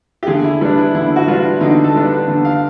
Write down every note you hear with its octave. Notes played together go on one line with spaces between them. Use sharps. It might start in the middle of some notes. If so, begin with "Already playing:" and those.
G4
D3 G#4
E4
G3 B3 D4
E4
D3 E4
F#4
G3 B3 D4 F4
D3 D#4
A4
G3 B3 D4
D3
F5